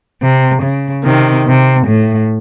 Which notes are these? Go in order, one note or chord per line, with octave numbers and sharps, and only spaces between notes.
C3
C#3
C3 D#3
C3
A2